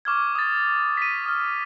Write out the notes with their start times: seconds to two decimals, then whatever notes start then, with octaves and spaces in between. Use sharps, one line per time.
0.05 C#6 D6 F6 G#6
0.35 D#6 A6
0.97 B6 D#7
1.26 D#6 F6